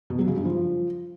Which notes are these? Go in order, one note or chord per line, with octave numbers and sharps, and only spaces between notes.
B2
F#3
C#3
G2
F3